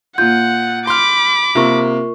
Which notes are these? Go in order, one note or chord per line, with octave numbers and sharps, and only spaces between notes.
A#2 F4 F#5 G6
B5 C6 D6 F6
C3 A#3 F4 A#4 C#6